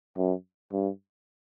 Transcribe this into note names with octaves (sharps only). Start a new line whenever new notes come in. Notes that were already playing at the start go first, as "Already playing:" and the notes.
F#2
G2